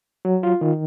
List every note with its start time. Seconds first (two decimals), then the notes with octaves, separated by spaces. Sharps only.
0.25 F#3
0.43 F4
0.61 D#3